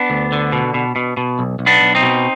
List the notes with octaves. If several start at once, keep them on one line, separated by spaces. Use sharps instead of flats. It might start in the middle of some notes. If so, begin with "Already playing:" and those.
Already playing: B3 D4
D2
D3
B2
B2
B2
B2
B1
B1
B3 D4
B1
C4 D#4
B2